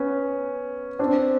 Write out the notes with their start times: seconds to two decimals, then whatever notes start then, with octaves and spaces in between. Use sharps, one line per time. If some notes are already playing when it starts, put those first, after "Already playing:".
Already playing: B3 C#4
0.99 C4 D4